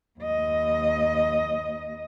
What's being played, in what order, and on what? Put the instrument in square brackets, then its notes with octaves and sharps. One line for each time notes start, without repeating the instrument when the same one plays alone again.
[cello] D#2 D#5